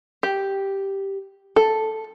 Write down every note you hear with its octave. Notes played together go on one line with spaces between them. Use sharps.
G4
A4